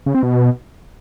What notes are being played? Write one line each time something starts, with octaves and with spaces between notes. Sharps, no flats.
C#3
C4
B2